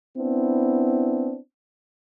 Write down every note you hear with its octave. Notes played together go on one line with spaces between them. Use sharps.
B3 C4 D4 E4